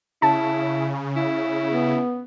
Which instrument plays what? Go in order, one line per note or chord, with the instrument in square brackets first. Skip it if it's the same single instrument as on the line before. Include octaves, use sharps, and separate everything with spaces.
[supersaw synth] C#3 [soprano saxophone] E4 [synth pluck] A5
[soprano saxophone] E4
[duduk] B3